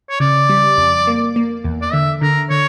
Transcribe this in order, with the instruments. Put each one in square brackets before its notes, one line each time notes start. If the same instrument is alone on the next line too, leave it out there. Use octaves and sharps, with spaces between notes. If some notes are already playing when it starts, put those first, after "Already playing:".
[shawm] C#5
[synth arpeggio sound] C#3 [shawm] D5
[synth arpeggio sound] G3
F2
A#3
A#3
E2
[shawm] D5
[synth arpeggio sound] D3 [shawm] E5
[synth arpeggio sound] D3 [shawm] A#4
[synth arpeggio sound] D3 [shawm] C#5